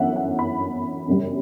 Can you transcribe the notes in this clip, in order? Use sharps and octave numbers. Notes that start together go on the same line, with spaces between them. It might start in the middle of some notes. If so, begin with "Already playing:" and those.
Already playing: G1 F#2 E3 E5 F#5
F#5
B5
G1 F#2 C#3 G3